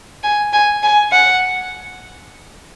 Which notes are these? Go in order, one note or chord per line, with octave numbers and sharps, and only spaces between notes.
G#5
G#5
G#5
F#5